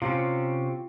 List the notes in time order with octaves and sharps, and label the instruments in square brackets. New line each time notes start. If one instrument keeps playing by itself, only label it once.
[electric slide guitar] C3 C4 C#4 [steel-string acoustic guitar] F4 G4